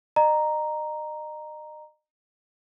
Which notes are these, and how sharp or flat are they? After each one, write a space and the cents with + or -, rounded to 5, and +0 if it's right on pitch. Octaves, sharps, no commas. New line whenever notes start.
D#5 -35 A#5 +0